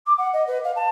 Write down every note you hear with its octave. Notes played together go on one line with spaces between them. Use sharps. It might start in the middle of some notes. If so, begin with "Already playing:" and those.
D6
F#5
D#5
B4
F5
A5